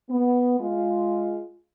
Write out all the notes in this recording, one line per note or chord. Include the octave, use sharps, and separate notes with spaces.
B3
G#3 F4